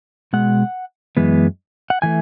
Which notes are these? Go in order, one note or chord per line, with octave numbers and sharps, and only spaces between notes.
B2 G#3 F#5
F#2 E3 G#3 B3
F#5
E3 A3 G#5